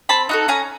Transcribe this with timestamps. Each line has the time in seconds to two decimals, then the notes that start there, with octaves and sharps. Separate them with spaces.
0.09 C4 A5 B5
0.29 D#4 F#4 A4
0.48 C#4 G#5 A#5